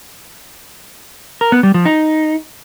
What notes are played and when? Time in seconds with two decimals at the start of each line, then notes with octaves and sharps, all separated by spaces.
1.41 A#4
1.52 B3
1.63 G3
1.74 F3
1.86 D#4